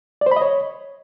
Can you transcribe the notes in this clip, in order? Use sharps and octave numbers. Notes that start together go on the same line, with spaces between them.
D5
C5
B5
D#5
C#5